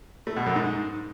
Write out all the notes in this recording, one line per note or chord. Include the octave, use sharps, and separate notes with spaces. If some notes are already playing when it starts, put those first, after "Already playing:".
A3
B2
F#2
G#2